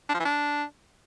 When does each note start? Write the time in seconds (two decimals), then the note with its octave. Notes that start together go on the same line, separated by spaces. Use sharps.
0.09 D4
0.14 F3
0.20 E3
0.25 D4